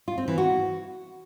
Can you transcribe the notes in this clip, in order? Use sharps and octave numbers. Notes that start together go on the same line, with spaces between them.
F4
C4
E3
F#4